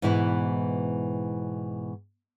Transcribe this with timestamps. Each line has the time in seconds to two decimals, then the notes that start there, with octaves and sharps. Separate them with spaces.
0.02 G#2 B2 E3 E4 B4